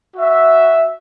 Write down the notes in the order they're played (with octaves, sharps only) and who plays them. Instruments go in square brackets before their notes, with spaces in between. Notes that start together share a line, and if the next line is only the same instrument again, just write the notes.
[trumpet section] F#4 E5